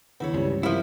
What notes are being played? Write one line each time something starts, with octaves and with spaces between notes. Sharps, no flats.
D#2 C#3 B3 E4 C#5
C#2 G2 C3 E3 G3
F3 A#3 E4